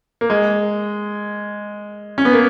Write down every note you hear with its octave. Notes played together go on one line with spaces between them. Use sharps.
A#3
G#3
C#4
B3
A#3